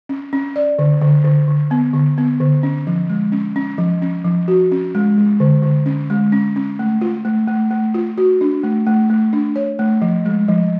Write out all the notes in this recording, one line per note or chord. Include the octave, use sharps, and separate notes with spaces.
C#4
C#4
D5
D3
D3
D3
D3
B3
D3
B3
D3
C#4
F3
G#3
C#4
C#4
F3
C#4
F3
F#4
C#4
G#3
G#3
D3
D3
C#4
G#3
C#4
C#4
A3
F4
A3
A3
A3
F4
F#4
D4
A3
A3
A3
D4
C#5
A3
F3
G#3
F3